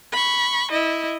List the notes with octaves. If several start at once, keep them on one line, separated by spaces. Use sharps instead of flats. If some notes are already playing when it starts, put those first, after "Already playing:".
B5 C#6
E4 D#5